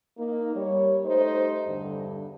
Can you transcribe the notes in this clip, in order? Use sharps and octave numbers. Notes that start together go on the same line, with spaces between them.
A#3 D#4
G3 C#5
A3 D#4 G4 C5
E2 G2 D3